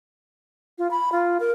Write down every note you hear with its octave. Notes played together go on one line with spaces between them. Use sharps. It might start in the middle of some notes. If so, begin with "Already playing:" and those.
F4
B5
F4
A#4